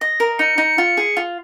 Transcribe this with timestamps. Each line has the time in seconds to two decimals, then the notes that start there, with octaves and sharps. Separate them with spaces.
0.01 D#5 A#6
0.20 A#4
0.39 D#4 C#7
0.58 D#4
0.78 F4
0.97 G#4
1.17 F4